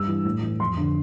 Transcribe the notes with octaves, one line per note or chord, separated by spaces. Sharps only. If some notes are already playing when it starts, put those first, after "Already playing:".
Already playing: G2 E6
E3
A2
E3
F2 C6
D3